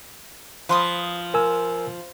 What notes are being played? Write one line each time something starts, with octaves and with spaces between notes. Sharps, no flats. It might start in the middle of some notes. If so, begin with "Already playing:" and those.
F3 B4 C6 D#6
A#4 G#5 E6